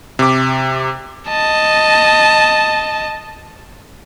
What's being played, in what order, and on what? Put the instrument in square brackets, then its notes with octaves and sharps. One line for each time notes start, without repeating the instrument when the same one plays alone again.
[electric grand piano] C3 D6
[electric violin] D#5 A5